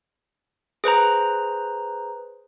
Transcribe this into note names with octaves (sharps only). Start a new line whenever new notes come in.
G#4 B4 C5 A#5